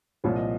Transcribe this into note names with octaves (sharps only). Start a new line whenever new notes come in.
C2 A#2 F3 C#5
D#5